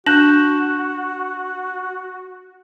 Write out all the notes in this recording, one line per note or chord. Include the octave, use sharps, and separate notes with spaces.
D4 F#4 F#6 G6 E7